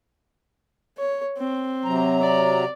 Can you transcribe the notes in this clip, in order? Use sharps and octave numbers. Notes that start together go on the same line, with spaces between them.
C#5
C4
C3 F#3 A#5
D5